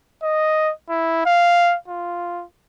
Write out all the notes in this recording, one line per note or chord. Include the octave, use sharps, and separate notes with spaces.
D#5
E4
F5
F4